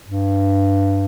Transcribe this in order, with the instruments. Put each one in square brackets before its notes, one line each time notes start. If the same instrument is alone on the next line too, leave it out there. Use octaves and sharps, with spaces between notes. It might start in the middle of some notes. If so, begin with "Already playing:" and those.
[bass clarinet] G2